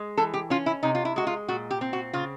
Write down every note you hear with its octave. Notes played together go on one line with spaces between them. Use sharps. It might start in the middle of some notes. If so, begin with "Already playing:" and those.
Already playing: G#3
E3 A4
G4
C#4 F4
E4
C3 D#4
F4
E4
G#3 F#4
F4
A#2 F#4
G4
C4
F#4
C#3 F4